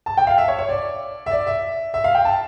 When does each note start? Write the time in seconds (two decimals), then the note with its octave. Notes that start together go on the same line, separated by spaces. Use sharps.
0.06 A5
0.17 G5
0.27 F5
0.38 E5
0.48 C#5
0.59 C#5
0.69 D5
1.26 E5
1.31 D5
1.47 E5
1.94 E5
2.04 F5
2.15 G5
2.25 A5